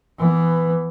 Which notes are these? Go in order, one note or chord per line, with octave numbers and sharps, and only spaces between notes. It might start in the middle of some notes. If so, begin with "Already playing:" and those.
E3 B3